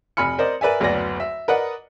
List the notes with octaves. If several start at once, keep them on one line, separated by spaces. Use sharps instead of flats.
F1 G#5 B5 F6 C#7
A#4 C5 D5 D#5
A#4 B4 D5 E5 G#5
F#1 D2 F#3 B3 D5 A#6
E5
A#4 B4 D5 D#5 F#5